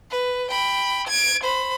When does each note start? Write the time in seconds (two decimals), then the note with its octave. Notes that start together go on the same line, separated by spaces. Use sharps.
0.11 B4
0.50 G5 B5
1.07 G#6 D7
1.43 C5 B5